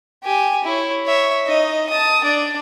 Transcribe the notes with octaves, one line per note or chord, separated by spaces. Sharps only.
G4 G#5
E4 C#5
C#5 E5
D#4 D#5
A5 D#6
D4 D5